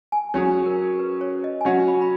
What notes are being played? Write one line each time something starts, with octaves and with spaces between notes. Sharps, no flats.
G#5
F#3 C#4 G#4 C#5
A#4
B4
C#5
D#5
G#5
F#3 C#4 F#4 F#5
B5
B5